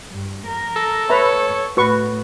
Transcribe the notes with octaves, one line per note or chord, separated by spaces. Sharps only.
G2
A#4
A4
B4 C#5 E5 A#5
A2 F#4 B4 C#6